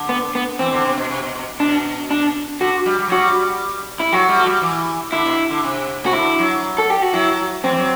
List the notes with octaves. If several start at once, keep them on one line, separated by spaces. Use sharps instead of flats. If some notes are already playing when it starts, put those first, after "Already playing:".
Already playing: D3
B3
B3
E3 C4
D3
C3
B2
C3
B2
B2
B2 D4
D4
D3 F#4
G3
G3
F#3
F#4
G3
E4
F#3 F#4
G3
A3
G3
E3
D3 E4
B2
D3
C3
C3 F#4
D3 E4
F#3
A4
G4
F#4
F#3 E4
F#3 C4
E3
F#3